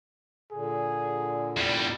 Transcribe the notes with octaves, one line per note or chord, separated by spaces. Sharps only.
A#2 D3 G#4
E2 G3